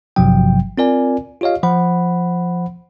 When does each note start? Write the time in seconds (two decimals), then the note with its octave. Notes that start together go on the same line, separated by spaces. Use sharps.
0.16 G#1 G2 C3 F3 F#3 G5
0.78 C4 F4 A#4 D5 G#5
1.41 F4 G4 C#5 D#5 F5
1.63 F3 C5 F#5 B5